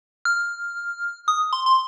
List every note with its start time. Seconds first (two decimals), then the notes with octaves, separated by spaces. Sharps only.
0.25 F6
1.28 D#6
1.53 C6
1.66 C6